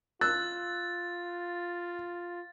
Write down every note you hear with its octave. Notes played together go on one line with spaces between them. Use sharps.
F4 E6 F#6 A6